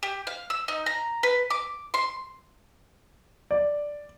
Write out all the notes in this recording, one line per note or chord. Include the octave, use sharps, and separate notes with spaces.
G4
F5
E6
D#4
A#5
B4
D6
C6
D5